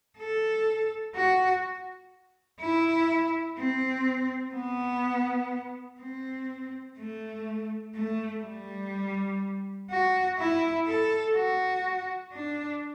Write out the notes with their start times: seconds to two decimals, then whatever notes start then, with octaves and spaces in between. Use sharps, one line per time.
0.18 A4
1.15 F#4
2.61 E4
3.59 C4
4.55 B3
6.01 C4
6.98 A3
7.95 A3
8.44 G3
9.90 F#4
10.39 E4
10.87 A4
11.35 F#4
12.32 D4